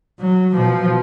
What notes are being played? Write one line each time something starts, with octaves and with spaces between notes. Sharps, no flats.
F#3
B2 F3